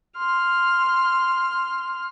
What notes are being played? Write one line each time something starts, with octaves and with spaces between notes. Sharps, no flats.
C6 F6